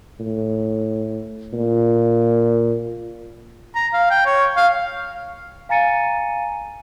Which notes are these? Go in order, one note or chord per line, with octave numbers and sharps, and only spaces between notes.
A2
A#2
A#5
F5
G5
C#5
F5
F5 G#5 A#5 A6 C#7 D#7